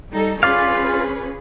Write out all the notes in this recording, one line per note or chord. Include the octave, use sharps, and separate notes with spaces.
G3 D#4 A4
C#4 F4 G#4 B4 D5 F5